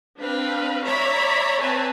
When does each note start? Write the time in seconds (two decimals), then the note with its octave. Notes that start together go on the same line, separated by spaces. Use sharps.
0.19 C4 D4 B4 F5
0.85 C#5 D5 E5 A#5 B5
1.62 C4 B4 G#5 A5